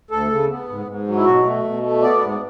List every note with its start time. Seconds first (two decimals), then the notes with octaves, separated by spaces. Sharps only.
0.11 D2 A4
0.30 C#3
0.49 B3
0.69 G#2
0.87 G#2
1.07 F#3
1.16 E4
1.25 B2 F#4
1.45 A3
1.64 B2
1.83 A3
2.02 B3 D5
2.21 G#2